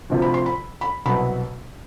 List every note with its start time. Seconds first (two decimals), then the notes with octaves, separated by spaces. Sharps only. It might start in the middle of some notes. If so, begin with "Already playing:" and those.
0.10 D2 C3 F3
0.22 B5
0.34 C6
0.46 B5
0.81 B5
1.06 C2 B2 F#3 B5